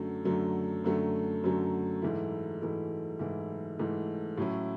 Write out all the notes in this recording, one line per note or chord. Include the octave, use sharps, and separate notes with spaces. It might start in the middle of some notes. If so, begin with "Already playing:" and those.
Already playing: F#2 D3 F#3 A3
F#2 D3 F#3 A3
F#2 D3 F#3 A3
F#2 D3 F#3 A3
G#2 E3 A3 E4
G#2 E3 A3 E4
G#2 E3 A3 E4
G#2 E3 A3 E4
A2 F#3 C#4 E4